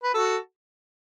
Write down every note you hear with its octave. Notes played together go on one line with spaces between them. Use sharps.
B4
F#4 A4